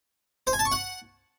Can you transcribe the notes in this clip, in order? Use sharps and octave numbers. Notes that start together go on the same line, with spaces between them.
C5
G#5
A5
C#6
F#5